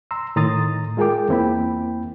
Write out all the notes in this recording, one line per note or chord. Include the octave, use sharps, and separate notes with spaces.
A#5 C6 E6
A2 D#3 A#5 C6 D#6 A6
G#3 F4 G#4 A#4 G5 D6
E2 A#3 C4 E4 G5 B5